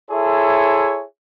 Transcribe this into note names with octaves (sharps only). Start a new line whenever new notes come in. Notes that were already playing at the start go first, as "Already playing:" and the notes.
E4 G#4 A4 C5 C#5 E5